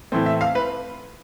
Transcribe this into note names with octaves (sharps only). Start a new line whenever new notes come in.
A2 E3 A3 C4
E5
F5
B4